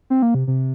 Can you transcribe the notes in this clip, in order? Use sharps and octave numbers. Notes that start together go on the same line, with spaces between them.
C4
A#3
C3
C3